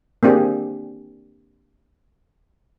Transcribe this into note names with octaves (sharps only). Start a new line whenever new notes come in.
A#3 C4 D4 G4 G#4